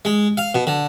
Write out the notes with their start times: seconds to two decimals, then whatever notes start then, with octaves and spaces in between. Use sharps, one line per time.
0.05 G#3
0.37 F5
0.54 B2
0.67 D3